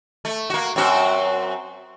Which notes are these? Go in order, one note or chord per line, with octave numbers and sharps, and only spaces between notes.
A3
A#3 F#4
F#2 C4 F#4